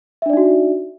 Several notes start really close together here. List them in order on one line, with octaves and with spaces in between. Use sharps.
E5 D4 D5 D#4 F#4